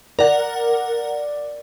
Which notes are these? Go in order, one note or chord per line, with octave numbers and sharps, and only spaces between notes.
A#4 D5 F#5